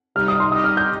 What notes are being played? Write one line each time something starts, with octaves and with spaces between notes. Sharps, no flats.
C3 G3 D#4 F6
D#6
C6
G3 D#4 G4 D#5 D#6
F6
G6